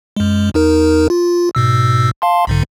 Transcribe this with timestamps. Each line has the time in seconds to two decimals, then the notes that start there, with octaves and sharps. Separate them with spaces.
0.16 F#2 G#3
0.54 E2 D#4 A#4
1.10 F4
1.55 G#2 B2 E6
2.22 F5 A5 C6
2.47 B1 G#2 D3